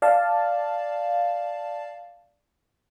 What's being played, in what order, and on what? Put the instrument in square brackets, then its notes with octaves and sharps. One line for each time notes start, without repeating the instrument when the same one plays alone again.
[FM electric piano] D5 F5 A5